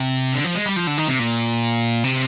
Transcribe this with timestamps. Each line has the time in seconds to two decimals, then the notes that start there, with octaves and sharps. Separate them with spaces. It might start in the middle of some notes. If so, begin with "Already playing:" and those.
Already playing: C3
0.34 D3
0.44 F3
0.55 G#3
0.66 G3
0.76 F3
0.87 D3
0.98 D#3
1.08 C3
1.19 A#2
2.04 C3